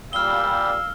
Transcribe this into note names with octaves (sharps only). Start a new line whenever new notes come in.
A#2 G3 F5 E6 F6 G7